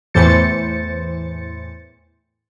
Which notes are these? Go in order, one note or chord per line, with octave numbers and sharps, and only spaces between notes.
E2 A2 E3 C5 A6 C#7